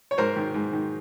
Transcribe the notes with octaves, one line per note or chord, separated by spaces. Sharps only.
C#5
G#2 A#4 C5
D#3
G#2
D#3